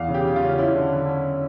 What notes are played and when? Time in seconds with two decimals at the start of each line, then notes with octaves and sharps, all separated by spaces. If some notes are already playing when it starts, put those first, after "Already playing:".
Already playing: E2 F5
0.08 C#3
0.14 G4
0.25 C#3
0.36 F4
0.42 C#4
0.58 C#4 E4
0.75 D3
0.92 D3
1.09 C#4